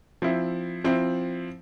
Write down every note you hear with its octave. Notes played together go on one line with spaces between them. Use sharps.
F3 C4 E4
F3 C4 E4